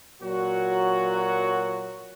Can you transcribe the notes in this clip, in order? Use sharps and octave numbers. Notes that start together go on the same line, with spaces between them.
A#2 F#3 F#4